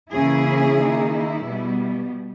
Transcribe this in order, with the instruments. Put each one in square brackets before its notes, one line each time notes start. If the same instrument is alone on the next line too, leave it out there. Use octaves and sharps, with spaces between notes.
[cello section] C#3 E3 A#3 C#4 E4 G#4
D#3 A#3 D#4
E4
B2 G3 B3